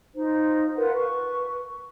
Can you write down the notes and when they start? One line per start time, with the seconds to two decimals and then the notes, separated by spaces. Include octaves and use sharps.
0.15 D#4 F4 C5
0.76 F4 A#4 B4 F#5
0.95 B4 C#6